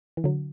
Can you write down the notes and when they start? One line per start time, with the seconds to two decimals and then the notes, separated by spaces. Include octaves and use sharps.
0.17 E3
0.24 D3 F#3